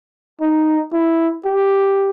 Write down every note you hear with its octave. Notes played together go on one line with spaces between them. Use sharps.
D#4
E4
G4